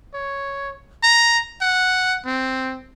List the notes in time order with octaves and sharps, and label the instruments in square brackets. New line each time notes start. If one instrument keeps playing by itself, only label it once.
[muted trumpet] C#5
A#5
F#5
C4